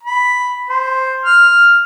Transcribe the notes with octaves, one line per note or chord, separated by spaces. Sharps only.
B5
C5
F6